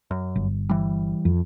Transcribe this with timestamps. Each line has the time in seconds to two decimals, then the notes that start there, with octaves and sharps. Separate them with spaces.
0.11 F#2
0.36 G1
0.69 E3 G3
1.25 F2